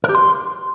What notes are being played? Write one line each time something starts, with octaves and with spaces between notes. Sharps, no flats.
A#4
G4
C6